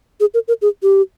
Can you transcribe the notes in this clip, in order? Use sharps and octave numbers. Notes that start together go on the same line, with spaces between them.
G#4
A#4
A#4
G#4
G4